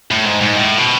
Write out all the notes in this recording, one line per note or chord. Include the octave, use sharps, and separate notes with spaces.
A2
G#2
G#2
A2
B2